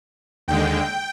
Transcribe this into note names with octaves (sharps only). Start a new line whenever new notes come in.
D#2 D3 G#3 G5